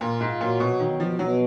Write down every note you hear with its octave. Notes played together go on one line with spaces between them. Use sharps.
A#2 F4
G#2
A#2 F#3
B2
B2 D#3
F3
B2 F#3